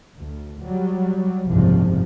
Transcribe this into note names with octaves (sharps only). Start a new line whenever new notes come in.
D2
F#3 G3
F#1 C2 G#2 C3 F3